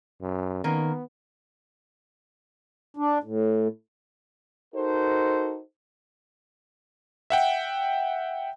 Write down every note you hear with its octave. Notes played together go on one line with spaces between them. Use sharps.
F#2
D#3 A#3 B3 C#4 A#4
D4
A2
D#4 F#4 A4 A#4 C5
E5 F#5 G5